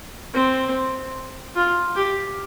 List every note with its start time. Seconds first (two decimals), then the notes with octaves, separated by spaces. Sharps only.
0.34 C4
1.56 F4
1.96 G4